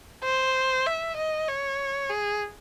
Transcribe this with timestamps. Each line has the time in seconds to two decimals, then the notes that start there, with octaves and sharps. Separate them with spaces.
0.24 C5
0.86 E5
1.17 D#5
1.48 C#5
2.10 G#4